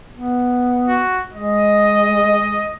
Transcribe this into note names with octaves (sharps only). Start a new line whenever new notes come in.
B3
F#4
G#3 D#5